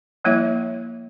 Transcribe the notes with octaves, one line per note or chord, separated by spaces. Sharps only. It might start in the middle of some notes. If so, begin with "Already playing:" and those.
F3 G3 A#3 E4 C#5 E5